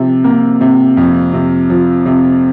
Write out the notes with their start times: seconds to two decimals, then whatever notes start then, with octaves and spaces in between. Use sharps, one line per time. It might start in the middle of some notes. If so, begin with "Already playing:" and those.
Already playing: C3 F3
0.24 A#3
0.61 C3
0.97 F2
1.33 C3
1.70 F3
2.06 C3